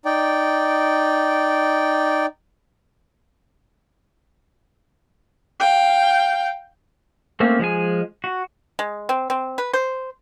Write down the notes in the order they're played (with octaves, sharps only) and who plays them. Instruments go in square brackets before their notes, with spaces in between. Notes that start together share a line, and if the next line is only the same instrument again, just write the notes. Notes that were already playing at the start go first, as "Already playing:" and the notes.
[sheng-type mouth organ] D#4 D5 G5
[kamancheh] F5 G5
[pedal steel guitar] A3 A#3 C4 C#4
F3 G#3 G#4 G#5
F#4
[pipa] G#3
C4
C4
B4
C5